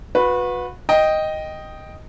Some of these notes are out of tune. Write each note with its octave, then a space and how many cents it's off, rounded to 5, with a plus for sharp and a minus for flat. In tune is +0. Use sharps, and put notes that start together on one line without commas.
F#4 -35 B4 +0
D#5 +0 G5 +0